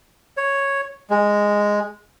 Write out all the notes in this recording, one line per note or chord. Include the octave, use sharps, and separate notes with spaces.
C#5
G#3